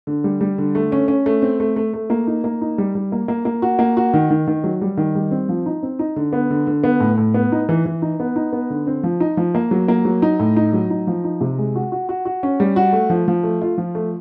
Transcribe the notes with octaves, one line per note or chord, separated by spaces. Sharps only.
D3
G3
G3
D3
A3
C#4
C#4
A3
C4
A3
A3
A3
A#3
D#4
A#3
D#4
G3
G3
A#3
A#3
A#3
F#4
A#3
F#4
D#3
D#3
D#3
F#3
G3
D#3
G3
C4
F3
D#4
C4
D#4
D3
B3
D3
D3
B3
A2
A2
B3
D#4
E3
E3
D#4
B3
D#4
B3
D3
C4
F3
D#4
F3
A#3
F#3
A#3
F#3
D#4
A2
D#4
F#3
D#4
F3
D#4
C3
G#3
F#4
F#4
F#4
F#4
C#4
G3
F#4
A3
F3
F3
A3
F4
F3
A3